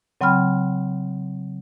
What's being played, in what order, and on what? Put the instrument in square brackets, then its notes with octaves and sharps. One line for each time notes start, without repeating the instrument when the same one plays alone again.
[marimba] C#3 F#3 C4 G5 B5 F6